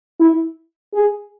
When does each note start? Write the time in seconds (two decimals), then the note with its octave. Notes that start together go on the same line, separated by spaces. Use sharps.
0.20 E4
0.94 G#4